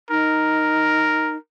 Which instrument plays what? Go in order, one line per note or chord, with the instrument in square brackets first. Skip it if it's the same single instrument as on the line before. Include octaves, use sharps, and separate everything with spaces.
[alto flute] D#4 [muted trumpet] A#4